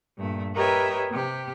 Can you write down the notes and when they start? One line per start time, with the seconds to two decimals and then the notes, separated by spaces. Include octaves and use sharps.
0.18 G2 A#2 A3
0.55 G4 A#4 B4 C#5 D#5 E5
1.11 C3 G4